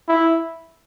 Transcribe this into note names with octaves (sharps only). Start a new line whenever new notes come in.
E4